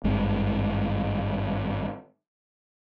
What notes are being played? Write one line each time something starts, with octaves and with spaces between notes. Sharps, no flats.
G#1 G2 G#3